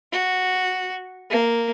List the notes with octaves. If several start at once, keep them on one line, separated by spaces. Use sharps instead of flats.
F#4
A#3